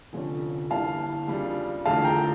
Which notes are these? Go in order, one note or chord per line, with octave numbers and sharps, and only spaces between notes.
F1 F2 D3 F3 C#4
G1 G2 E3 G3 A#3 F5 A5
F2 C#3 G3 D4 F4
E1 E2 D3 F3 A3 F5 A5
G5 A#5